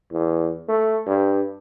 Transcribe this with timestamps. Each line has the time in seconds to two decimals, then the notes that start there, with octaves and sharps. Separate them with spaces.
0.12 E2
0.68 A3
1.06 G2